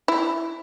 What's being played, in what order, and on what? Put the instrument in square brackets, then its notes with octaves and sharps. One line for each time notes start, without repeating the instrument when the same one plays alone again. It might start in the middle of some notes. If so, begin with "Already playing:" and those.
[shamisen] E4